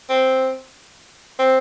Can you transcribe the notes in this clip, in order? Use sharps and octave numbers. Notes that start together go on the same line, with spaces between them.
C4
C4